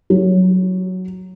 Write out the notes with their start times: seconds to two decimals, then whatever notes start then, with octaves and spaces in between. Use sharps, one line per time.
0.10 F#3